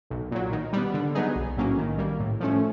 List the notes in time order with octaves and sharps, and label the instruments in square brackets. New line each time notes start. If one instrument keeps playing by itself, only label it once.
[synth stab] B1
A#2 F#3
D#3
G3 B3
D3
F#3 B3 D#4 G#4
B1
A2 F#3 A#3 C#4
D#3
G3 A#3
A2
F3 A3 C#4